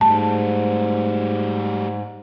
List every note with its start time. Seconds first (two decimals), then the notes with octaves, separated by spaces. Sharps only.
0.01 G#2 G3 A3 A5